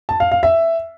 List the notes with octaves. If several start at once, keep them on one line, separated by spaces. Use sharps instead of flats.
A5
F5
F5
E5